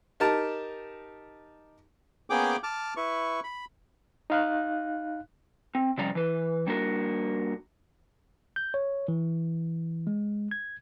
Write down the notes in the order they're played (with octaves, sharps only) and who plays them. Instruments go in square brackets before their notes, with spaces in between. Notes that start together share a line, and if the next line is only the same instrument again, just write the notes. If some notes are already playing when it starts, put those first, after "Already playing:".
[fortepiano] D#4 G4 A#4 A5
[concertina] A#3 B3 C#4 G#4 G5 D6
A5 D6 F6
E4 B4 C#6
B5
[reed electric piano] D#4 F5 F#6
[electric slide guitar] C4
C3 F3 G3 C#4 D5 A#5
E3 B4
G3 A#3 D4 F#4 A#4
[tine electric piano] G6
C#5
E3
G#3
G#6